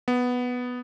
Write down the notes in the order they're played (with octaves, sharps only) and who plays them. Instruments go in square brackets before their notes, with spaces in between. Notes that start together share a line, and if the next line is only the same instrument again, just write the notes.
[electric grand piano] B3